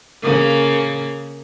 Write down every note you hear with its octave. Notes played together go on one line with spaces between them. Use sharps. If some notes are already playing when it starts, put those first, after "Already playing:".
C#3 A#3